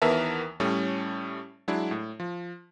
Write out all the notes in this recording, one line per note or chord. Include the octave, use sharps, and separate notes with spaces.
D#2 E3 B3 A#4 E5 A5
A2 G3 A3 C#4
F#3 G#3 D4 E4
A2
F3